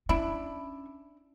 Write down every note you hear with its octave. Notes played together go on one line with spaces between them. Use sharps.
C#4 D4 E4